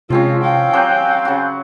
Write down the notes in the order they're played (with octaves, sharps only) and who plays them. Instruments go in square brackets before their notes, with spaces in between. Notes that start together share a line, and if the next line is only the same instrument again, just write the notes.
[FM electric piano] C3 [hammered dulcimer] F3 C4 C#4 [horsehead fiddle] G#3 F4
[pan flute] F5 [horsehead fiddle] G5
[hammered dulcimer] F#3 C4 G4 [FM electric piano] G#5 F#6 G6
[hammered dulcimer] C#3 F#4